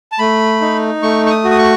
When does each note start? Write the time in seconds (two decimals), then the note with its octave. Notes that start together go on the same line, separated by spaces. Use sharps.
0.12 A5
0.19 A3 B5
0.61 D#4
1.02 A3 C#6
1.26 C#6
1.30 D#6
1.44 F#4
1.51 D#6
1.58 C#6